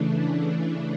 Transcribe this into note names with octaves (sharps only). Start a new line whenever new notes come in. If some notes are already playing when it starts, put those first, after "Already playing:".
Already playing: C#3 E3 A3 D4
F#5
E5